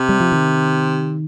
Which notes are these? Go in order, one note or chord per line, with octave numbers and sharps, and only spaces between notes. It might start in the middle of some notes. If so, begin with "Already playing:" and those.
Already playing: C3
G3
F3
D#3